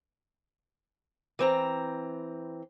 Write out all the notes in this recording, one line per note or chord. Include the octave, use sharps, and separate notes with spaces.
E3 C4 A#5